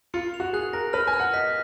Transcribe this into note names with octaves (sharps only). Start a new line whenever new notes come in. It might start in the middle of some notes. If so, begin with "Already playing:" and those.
F4 C#7
F7
F#4
G#4 F#6
A#4 A#6
B4 F6
G#5
F6
F#5
D#5 B6